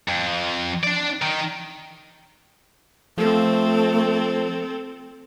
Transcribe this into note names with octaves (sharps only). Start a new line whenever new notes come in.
F2
D4 D5
D#3
F3 A3 C4 A4